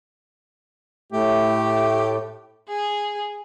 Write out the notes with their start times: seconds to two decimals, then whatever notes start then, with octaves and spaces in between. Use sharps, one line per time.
1.12 A2 A3 G4
2.68 G#4